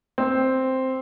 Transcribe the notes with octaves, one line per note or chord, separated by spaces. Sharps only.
C4